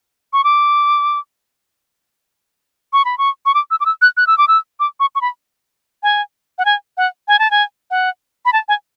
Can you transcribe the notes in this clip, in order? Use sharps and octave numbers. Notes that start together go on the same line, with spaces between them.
C#6
D6
C#6
B5
C#6
C#6
D6
E6
D6
E6
F#6
F#6
E6
D6
E6
D6
C#6
C#6
B5
G#5
F#5
G#5
F#5
G#5
A5
G#5
F#5
B5
A5
G#5